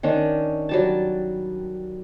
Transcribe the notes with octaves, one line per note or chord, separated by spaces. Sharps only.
D#3 C#4 D4
F#3 G3 A5